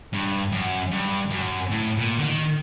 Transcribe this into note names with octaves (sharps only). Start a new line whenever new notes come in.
G2
F#2
G2
F#2
A2
A#2
D3
D#3